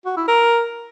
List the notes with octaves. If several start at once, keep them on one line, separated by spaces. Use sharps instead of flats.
F#4
E4
A#4